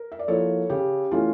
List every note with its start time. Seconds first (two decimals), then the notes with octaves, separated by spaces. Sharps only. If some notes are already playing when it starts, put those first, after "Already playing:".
Already playing: A#4
0.12 E5
0.19 D5
0.28 F3 A#3 E4 A4 C#5
0.70 C#3 G4
1.11 E3 A3 C#4 F4